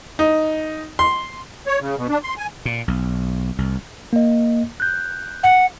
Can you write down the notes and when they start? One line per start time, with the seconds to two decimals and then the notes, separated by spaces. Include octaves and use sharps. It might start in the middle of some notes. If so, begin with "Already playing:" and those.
0.19 D#4
0.99 C6
1.67 C#5
1.80 C#3
1.96 B2
2.09 D4
2.23 C6
2.38 G#5
2.65 A#2
2.88 B1
3.58 C2
4.13 A#3 D#5
4.80 F#6 G6
5.43 F#5